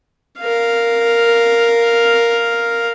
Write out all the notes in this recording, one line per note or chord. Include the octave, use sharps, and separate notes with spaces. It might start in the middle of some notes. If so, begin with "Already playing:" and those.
A#4 F5